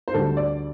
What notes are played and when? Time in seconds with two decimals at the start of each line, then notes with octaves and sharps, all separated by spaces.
0.08 C5
0.14 D2 D3 G3 A4
0.37 D5